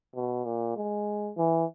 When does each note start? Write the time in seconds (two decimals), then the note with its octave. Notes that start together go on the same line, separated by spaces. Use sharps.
0.15 B2
0.45 A#2
0.76 G#3
1.37 E3